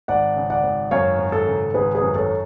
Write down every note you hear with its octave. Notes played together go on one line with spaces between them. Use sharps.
G#1 D5 F#5
C#3
D5 F#5
G#1
F#2 C#5 F5
G#1
A4
C#3
G#1 G#4 B4
G#4 B4
F#2
A4 C#5